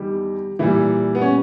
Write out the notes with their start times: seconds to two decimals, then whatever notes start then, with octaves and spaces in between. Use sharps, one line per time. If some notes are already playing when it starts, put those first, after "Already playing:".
Already playing: E2 D#3 G3 G4
0.59 A#2 E3 G3 E4
1.15 B3
1.21 C#4